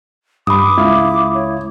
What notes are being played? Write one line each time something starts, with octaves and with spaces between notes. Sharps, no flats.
G2 B5 D6 D#6
C#2 E4 E5 F5
C#5